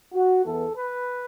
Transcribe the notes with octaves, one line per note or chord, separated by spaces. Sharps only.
F#4
E2 E3 B3 A4
B4